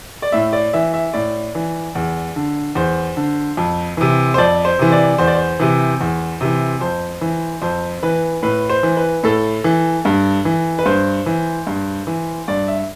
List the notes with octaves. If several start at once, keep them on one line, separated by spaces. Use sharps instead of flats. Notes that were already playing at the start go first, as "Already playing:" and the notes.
D5
A2 E5
D5
E3 E5
E5
A2 D5
E3
E2
D3
E2 C5
D3
F2
C3 E3
C5
F2 D5
C5
C3 E3
D5
E2 C5
D5
C5
C3 E3
E2
C3 E3
F2 C5
E3
F2 C5
E3 B4
A2 B4
C5
E3
B4
A2 A4
E3
G2
E3
B4
G2 C5
E3
G2
E3
G2 D5
E5